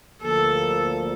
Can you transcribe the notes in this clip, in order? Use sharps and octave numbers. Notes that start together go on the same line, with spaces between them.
D2 D3 F3 A#3 A4